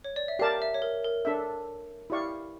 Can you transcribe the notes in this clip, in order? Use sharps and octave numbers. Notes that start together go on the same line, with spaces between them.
C#5
D5
E5
G4 A#4 D5 F5 A5
E5
C#5
A#4
A#4
D4 A4 E5
E4 G4 D5 F5 C#6